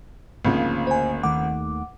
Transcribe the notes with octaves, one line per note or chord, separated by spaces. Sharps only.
G#1 D2 C#3 F3 A#3
C5 G#5
D#2 D#3 A3 F#5 D6